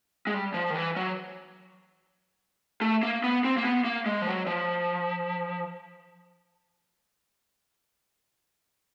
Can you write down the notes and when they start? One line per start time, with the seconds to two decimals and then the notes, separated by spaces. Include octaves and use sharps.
0.27 G#3
0.34 G3
0.54 F3
0.70 D#3
0.75 E3
0.96 F#3
2.81 A3
3.03 A#3
3.24 B3
3.44 C4
3.57 A#3
3.65 B3
3.85 A#3
4.06 G#3
4.22 F3
4.27 F#3
4.47 F3